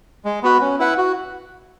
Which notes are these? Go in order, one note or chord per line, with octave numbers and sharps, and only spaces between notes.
G#3
B3 F#4 B4
C#4
E4 B4 F#5
F#4